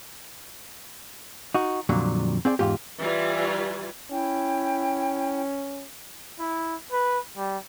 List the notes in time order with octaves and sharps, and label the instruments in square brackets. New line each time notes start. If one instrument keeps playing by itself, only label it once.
[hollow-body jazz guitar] D#4 F#4
F2 A#2 D3 F#3 G3
C4 G#4 D5 G5
E2 G#2 F4 G4
[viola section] E3 G3 F4 D5 G#5
[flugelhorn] C#4 [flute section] E4 G5
[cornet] E4
B4
G3